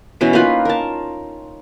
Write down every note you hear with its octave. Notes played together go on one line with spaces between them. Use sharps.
B2 E3 C#4
A#3 D#4 F4 B4
A#4 A5